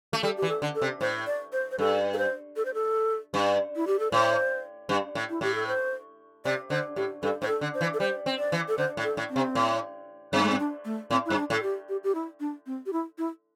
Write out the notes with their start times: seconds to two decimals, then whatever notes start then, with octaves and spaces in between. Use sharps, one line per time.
0.13 A3
0.23 G3 A4
0.37 G4
0.42 E3
0.49 A4
0.62 D3
0.75 A4
0.82 C3
1.01 A2 C5
1.27 D5
1.53 C5
1.71 C5
1.79 G2 A4
2.13 A4
2.18 C5
2.56 A4
2.65 C5
2.74 A4
3.34 G2
3.76 E4
3.87 G4
3.99 A4
4.12 A2 C5
4.89 G2
5.15 A2
5.30 E4
5.41 A2 G4
5.55 A4
5.67 C5
6.45 C3 D5
6.70 D3 C5
6.96 A2 G4
7.23 G2 A4
7.42 A2 C5
7.48 A4
7.61 D3
7.75 C5
7.81 E3
7.94 A4
8.00 G3 C5
8.26 C4
8.39 D5
8.52 E3
8.68 A4
8.78 D3 C5
8.97 A2
9.04 A4
9.17 A2
9.30 C4
9.36 C3
9.55 A2
10.33 G2 C4
10.42 A3
10.50 C4
10.59 D4
10.85 A3
11.11 A2 C4
11.26 G2 E4
11.37 D4
11.50 A2 A4
11.63 G4
11.89 G4
12.04 G4
12.15 E4
12.40 D4
12.66 C4
12.86 G4
12.93 E4
13.18 E4